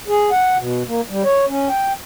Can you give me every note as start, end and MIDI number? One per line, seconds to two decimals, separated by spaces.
0.08 0.30 68
0.31 0.57 78
0.58 0.83 47
0.87 1.01 58
1.09 1.23 55
1.24 1.45 73
1.48 1.68 61
1.69 1.93 79